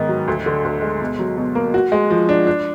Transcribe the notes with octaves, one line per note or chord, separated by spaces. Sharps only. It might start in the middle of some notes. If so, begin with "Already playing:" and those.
Already playing: G#2 D#3 B3
F#3
D2
D3
D2
G#3
B2
F#3
B2
A#3
F#4
G#3
F3
D4
D4